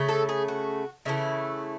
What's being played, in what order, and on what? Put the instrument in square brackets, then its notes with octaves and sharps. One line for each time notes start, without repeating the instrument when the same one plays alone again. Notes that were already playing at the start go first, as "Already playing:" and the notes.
Already playing: [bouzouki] C#3 A3
A4
G#4
F#4
C#3 E3 A3 E4